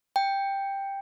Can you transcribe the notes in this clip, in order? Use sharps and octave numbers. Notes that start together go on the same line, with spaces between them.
G5